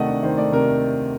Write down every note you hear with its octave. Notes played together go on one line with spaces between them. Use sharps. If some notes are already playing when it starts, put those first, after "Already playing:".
Already playing: C3 D#3 A3 D5 D#5 F#5
D4
D#3 C5
A3 D5
C3 A#4